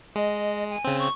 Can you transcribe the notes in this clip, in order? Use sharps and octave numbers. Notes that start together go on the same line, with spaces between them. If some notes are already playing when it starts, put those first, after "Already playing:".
G#3 D#5
G#5
C#3 C4
C#6